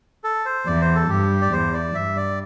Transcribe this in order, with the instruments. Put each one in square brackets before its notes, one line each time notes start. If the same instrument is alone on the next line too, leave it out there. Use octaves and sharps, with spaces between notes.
[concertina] A4
C5
[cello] E2 [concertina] D5
[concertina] C5
A4
[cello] G2 [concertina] G4
[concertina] D5
[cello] E2 [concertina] C5
[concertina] D5
[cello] G2 [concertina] E5
[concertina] D5